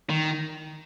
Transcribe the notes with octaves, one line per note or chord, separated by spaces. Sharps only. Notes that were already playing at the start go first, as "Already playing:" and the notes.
D#3